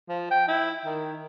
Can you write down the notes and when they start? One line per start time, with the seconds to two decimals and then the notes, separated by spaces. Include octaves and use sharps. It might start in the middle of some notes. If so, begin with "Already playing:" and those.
0.09 F3
0.31 G5
0.48 E4
0.85 D#3